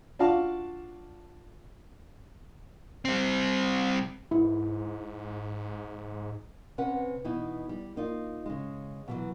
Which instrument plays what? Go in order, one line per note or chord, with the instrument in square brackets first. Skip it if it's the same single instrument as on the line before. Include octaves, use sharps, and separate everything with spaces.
[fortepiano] D4 F4 F#4 F5 A5
[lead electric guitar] G3 C4
[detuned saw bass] G#2 [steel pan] E4
[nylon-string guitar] C3 C#4 B4 F#5
B2 E3 D#4 E4
G3
A#3 D#4 F4
C#3 G#3
B2 E3 F#3